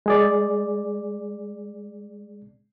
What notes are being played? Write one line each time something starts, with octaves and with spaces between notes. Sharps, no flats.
G#3 G#4 D5